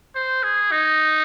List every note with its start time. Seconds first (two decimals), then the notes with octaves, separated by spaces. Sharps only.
0.15 C5
0.43 G#4
0.72 D#4